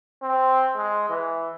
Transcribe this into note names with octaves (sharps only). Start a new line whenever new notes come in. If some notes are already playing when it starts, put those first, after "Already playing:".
C4
G#3
E3